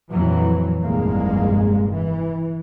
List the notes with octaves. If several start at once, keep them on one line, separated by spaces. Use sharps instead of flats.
F2 A#2 E3 F#3
F1 C2 G2 A#2 G#3 A#3
E3